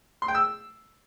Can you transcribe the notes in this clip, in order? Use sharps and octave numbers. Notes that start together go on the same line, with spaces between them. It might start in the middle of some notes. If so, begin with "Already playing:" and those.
C6
G5
E6